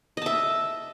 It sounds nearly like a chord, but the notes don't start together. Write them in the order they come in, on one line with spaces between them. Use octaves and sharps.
D#5 A5 E5